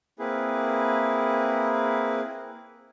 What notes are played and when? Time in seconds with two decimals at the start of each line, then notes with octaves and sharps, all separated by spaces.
0.19 A#3 C4 E4 G#4 B4